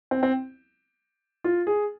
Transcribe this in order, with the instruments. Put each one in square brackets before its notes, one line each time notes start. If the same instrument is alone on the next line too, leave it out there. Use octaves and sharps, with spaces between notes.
[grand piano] C4
C4
F4
G#4